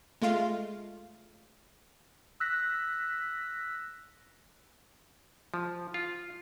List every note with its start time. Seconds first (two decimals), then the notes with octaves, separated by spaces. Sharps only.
0.22 G#3 A3 F4 F5
2.40 E6 F#6 A#6 B6
5.54 F3
5.94 F4